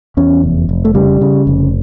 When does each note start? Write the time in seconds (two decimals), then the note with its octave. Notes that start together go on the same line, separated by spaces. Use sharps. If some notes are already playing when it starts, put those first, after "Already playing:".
0.17 E2 C#4
0.43 F1
0.69 F1
0.85 A3
0.95 C#3 G3
1.21 C#3
1.47 F1